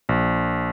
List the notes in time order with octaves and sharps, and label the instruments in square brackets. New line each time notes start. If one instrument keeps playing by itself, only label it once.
[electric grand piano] A#1